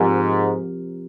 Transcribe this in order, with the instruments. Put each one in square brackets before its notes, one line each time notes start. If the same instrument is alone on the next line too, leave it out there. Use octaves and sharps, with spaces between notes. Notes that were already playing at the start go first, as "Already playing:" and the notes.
Already playing: [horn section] G#2 [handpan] F3 C4 G4 A#4